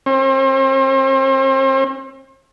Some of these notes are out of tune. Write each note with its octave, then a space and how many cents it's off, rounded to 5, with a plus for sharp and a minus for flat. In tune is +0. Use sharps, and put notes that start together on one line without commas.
C4 +40